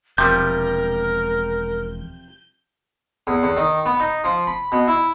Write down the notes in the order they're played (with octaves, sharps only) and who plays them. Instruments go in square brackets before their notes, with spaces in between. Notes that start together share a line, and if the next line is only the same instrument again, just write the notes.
[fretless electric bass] E1 [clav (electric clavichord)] C3 F3 G3 [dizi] A#4 [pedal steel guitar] G6
[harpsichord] E2
E2
D#3
B3
D#4
F3
B5
B2
E4